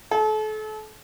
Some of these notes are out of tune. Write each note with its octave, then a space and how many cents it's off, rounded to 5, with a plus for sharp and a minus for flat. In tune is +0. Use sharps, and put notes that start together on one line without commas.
A4 -35